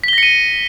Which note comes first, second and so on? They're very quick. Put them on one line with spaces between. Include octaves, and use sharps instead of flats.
B6 G7 A#6 C#7 D#7